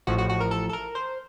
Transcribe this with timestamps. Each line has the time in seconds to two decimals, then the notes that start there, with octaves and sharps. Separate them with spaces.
0.07 A1 A2 F3 F#4
0.18 F#4
0.29 F#4
0.40 A#4
0.51 A4
0.69 A4
0.73 A#4
0.95 C5